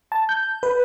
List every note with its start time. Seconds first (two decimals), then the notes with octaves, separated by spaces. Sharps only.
0.12 A5
0.29 G6
0.63 B4